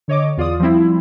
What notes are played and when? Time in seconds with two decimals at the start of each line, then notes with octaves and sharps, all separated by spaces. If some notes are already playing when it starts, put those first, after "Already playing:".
0.08 D3 C#5 D#5 D6
0.37 E2 F4 D5 D#6
0.60 F3 G3 C4 E4